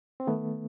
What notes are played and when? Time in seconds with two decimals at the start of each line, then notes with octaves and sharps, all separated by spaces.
0.20 C4
0.27 D#3 A3 B3